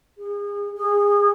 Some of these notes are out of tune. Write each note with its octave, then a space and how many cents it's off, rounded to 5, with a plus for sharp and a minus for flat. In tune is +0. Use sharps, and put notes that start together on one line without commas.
G#4 -35
G#4 -25